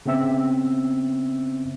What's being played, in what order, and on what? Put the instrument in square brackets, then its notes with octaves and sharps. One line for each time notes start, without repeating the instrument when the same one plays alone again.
[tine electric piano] C#3 B3 C4 E5 E6